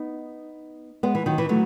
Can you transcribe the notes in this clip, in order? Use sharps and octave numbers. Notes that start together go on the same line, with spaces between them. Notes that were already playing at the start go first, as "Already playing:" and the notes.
Already playing: B3 D#4
G#3 B3
E3
D#3 F#3
E3
F#3 A3